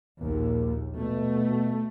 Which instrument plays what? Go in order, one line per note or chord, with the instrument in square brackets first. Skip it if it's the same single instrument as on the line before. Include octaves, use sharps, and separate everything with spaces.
[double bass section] A#1 D#2 [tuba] A#3
[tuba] B2 [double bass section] A3